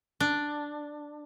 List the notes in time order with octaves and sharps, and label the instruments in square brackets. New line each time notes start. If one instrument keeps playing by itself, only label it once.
[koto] D4